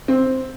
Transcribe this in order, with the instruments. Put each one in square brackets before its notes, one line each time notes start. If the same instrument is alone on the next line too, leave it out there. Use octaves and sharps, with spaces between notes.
[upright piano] C4